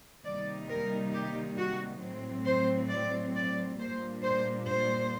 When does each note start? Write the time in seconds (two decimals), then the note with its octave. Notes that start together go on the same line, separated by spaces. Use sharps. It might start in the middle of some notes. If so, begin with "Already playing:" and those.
0.24 C3 D#3 G3 A#3 D#4 D5
0.68 A#4
1.13 G4
1.57 F#4
2.01 A2 F#3 C4
2.45 C5
2.90 D5
3.34 D5
3.78 A#2 G3 A#3 D4 C5
4.23 C5
4.67 C5